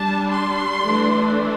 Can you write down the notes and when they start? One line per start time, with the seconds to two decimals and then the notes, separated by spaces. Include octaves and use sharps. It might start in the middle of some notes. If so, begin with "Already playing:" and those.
Already playing: G3 D4 A5
0.31 C6
0.86 E3 A3 D4